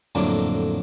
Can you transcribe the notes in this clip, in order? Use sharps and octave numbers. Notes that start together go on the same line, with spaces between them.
F2 A2 D3 F#3 A#3 D4